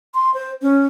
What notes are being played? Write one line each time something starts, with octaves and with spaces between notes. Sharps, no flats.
C6
C5
C#4